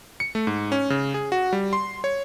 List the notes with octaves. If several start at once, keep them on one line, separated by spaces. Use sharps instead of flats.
C#7
A3
G#2
C#4
C#3
G#4
F#4
G3
C6
C#5